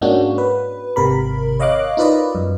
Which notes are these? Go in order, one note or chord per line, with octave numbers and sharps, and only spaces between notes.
G#2 G#3 A#3 C#4 D4 F#4
B4
G#1 C3 A#4 B5
C#5 D#5 F5 D6 F#6
D#4 F4 A#4 B4 D5 D#5
F#2